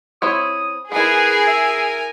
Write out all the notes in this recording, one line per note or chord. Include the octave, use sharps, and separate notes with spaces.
C4 E4 C#5 D#6
B3 E4 G#4 A#4 B4 G#5
E5